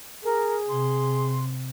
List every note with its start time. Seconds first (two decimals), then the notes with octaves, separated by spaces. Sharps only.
0.24 G#4 A#4
0.69 C3 C6